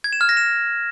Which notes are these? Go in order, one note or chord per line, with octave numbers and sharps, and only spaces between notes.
G#6
E7
F6
A#6
E7